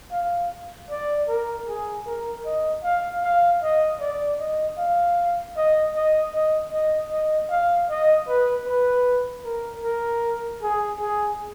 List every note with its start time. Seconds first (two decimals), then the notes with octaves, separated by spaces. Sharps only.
0.12 F5
0.90 D5
1.28 A#4
1.68 G#4
2.06 A#4
2.45 D#5
2.83 F5
3.23 F5
3.62 D#5
4.00 D5
4.40 D#5
4.78 F5
5.57 D#5
5.95 D#5
6.34 D#5
6.72 D#5
7.11 D#5
7.50 F5
7.89 D#5
8.28 B4
8.67 B4
9.45 A#4
9.83 A#4
10.62 G#4
11.00 G#4